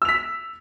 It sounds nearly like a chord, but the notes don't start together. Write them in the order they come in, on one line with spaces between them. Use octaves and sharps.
E6 F7 B6